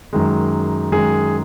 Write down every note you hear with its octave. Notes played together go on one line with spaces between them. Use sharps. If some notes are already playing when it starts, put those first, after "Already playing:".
F#2 D#3 G#3
F#2 D#3 G#3 G#4